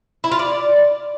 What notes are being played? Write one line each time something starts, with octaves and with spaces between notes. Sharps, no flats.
E4
F4
D5